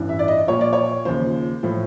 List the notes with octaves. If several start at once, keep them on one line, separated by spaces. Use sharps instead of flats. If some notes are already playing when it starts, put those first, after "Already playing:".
Already playing: A1 G2 E3
E5
D5
D#5
A#1 A#2 F3 C#5
D5
C#5
D#2 C#3 F3 C5
A2 F3